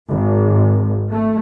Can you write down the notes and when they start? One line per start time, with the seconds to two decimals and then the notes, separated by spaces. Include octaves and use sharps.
0.11 G#1
1.10 A3